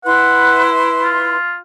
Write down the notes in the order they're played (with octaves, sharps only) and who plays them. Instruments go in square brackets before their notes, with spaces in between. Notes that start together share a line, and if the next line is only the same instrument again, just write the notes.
[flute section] E4 B4 C6 [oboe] F#5
[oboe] F4